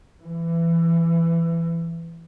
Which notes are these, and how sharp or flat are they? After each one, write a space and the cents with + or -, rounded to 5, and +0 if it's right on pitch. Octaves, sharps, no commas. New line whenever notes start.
E3 +20